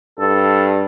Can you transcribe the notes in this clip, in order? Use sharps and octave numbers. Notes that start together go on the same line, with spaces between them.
G2 A4